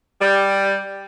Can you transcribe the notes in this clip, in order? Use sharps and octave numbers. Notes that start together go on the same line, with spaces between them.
G3